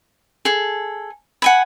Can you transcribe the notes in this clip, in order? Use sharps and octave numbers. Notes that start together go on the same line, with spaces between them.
G#4 A4
F#5 G#5 B5